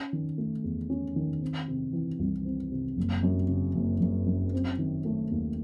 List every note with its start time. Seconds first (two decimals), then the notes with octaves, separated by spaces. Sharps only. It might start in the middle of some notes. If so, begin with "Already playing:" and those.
Already playing: C#4
0.13 D#3
0.38 A3
0.64 E2
0.90 C#4
1.16 D#3
1.42 C4
1.68 C3
1.93 E3
2.19 C2
2.45 C4
2.72 C3
2.97 F#1
3.23 F#2
3.48 C#3
3.75 F#1
4.01 F#1
4.26 F#2
4.53 C4
4.79 D#3
5.05 A3
5.31 D#2